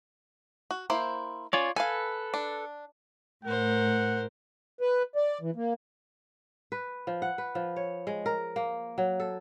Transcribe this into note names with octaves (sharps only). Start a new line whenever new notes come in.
F#4
A#3 E4 C5
C#4 F4 C#5 D5
A4 B4 F5 G#5
D4
A2 A#4 C5 F#5
B4
D5
E3
A#3
B4
F3
F#5
B4
F3
C#5
G#3
A#4
A#3
F#3
A4